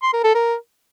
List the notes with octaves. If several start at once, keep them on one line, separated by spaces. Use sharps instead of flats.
C6
A#4
A4
A#4